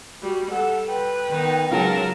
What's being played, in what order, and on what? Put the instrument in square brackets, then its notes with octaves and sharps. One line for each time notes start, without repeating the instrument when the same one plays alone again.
[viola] G3 [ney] F#4
[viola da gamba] G3 [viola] A4 [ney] F#5
[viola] B4 [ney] G5
[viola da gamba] D#3 B3 D#4
[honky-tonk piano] C#3 G#3 F4 [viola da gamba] F#3 [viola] A#4 A5